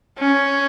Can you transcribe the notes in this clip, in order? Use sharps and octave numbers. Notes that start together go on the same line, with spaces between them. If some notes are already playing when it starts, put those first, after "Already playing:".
C#4